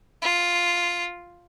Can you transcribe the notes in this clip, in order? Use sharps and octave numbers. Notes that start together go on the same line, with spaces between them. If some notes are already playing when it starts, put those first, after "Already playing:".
F4